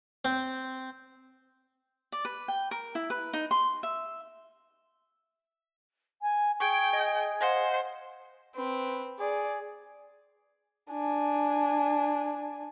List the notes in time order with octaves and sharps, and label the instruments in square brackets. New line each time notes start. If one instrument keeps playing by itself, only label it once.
[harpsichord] C4
[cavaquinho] D5
B4
G5
A#4
E4
B4
D#4
C6
E5
[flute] G#5
[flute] G#4 [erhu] G5 [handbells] C#6 G#6 D7
[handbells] D#5
[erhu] C5 [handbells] D#5 F5 F#5
[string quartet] C4 [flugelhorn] B4
[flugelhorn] G#4 [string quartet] D5
[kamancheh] D4 G#5